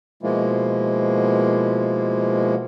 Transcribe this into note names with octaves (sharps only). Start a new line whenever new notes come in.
B2 F3 G#3 A#3 E4 F4